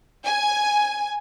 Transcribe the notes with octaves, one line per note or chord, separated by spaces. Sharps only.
G#5